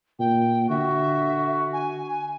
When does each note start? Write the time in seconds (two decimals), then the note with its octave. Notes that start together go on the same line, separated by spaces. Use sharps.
0.19 A#2 G5
0.70 D3 F#4 E5
1.73 G#5